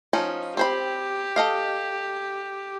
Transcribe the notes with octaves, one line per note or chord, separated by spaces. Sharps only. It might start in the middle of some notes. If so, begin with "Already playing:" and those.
F3 C#4 D#4
C4 G4 C5 B5
A4 D#5 F5